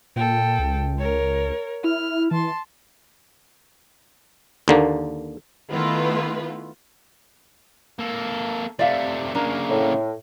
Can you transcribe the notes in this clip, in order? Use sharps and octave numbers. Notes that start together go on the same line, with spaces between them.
A#2 A4 G5
C#2
A#4 C#5
E4 F6
E3 A5 C6
D#2 D3 A#3
D#3 A3 B3 E4 F4 B4
A#3 A4
C3 A3 D5 E5 F5
C#3 A#3 D4 A#4
A2